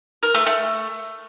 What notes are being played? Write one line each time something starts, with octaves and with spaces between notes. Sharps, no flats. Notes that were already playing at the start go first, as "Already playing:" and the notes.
A#4
A3
A3